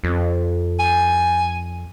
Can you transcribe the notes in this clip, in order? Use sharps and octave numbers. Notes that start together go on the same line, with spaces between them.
F2
G#5